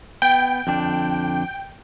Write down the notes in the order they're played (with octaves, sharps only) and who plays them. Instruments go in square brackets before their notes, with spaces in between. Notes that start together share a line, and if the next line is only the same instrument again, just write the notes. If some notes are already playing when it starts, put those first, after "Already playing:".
[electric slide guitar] B3 [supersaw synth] G5
[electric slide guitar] F2 D3 D4